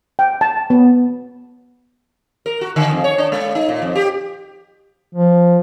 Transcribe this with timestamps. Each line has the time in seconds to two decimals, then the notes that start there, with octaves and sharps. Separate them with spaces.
0.19 G5
0.41 A5
0.70 B3
2.46 A#4
2.61 F#4
2.76 D3
2.91 F2
3.04 C#5
3.18 D4
3.32 G#3
3.55 D#4
3.68 A#2
3.82 F2
3.95 G4
5.15 F3